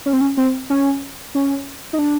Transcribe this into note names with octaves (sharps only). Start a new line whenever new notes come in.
C#4
C4
C#4
C4
C#4
C#4
D#4
D4